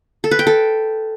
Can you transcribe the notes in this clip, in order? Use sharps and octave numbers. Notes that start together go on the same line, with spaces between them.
A4
B4
G5
A4